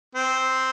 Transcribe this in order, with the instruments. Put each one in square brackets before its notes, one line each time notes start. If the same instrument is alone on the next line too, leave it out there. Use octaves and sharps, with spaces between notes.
[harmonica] C4